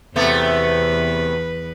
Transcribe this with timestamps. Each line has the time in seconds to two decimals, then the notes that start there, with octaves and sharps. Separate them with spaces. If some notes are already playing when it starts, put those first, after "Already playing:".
0.16 E2 C3 A3 B3 B4